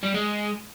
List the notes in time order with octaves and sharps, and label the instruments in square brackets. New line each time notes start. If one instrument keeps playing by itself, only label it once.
[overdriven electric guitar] G3
G#3